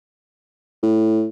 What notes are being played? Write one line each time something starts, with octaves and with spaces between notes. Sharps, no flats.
A2